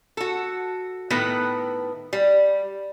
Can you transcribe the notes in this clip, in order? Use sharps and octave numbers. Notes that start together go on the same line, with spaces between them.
F#4 A4
A2 D#3 B3 A4 B4
G3